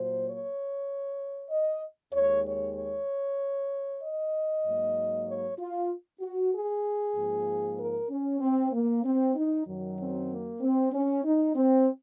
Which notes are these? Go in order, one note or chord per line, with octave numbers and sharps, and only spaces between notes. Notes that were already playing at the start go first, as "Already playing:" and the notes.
Already playing: A#2 F#3 A#3 C5
C#5
D#5
D#2 D#3 G#3 C#5
C#5
C#5
D#5
G#2 F#3 A#3
C#5
F4
F#4
G#4
G#2 F3 A#3
A#4
C#4
C4
A#3
C4
D#4
F#2 D#3 F#3
C4
A#3
C4
C#4
D#4
C4